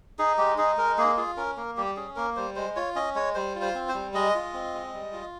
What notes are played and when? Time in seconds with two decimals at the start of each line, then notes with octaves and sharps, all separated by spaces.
0.19 D#4 G#4
0.38 G#3 G4
0.58 D#4 G#4
0.78 G#3 A#4
0.98 A#3 G#4
1.17 F4 G#4
1.37 C#4 A#4
1.57 A#3 A#4
1.77 G3 G4
1.96 C#4 G#4
2.16 A#3 A#4
2.36 G3 C5
2.56 G#3 C5
2.76 F4 C#5
2.96 C#4 D#5
3.15 G#3 C#5
3.35 G3 C5
3.55 F4
3.62 C5
3.75 C4
3.89 C5
3.95 G3
4.14 G#3 D#5
4.35 F4
4.54 C4
4.74 G#3
4.94 G3
5.13 F4